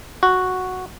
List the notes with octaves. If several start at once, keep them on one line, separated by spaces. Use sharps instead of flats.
F#4